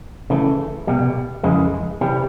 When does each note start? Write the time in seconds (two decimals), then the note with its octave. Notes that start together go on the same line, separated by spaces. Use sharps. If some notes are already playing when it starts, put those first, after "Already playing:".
0.30 C#3 E3 A3
0.87 C2 B2 G3
1.43 F2 C#3 E3 G#3
2.01 C3 E3 G3